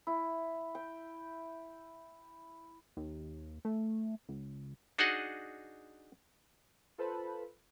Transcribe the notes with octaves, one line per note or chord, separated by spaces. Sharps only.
E4
G5
D#2
A3
C#2
D4 D#4 F#4 G#4 D#5 F#5
F4 A4 B4 C5 A5 B5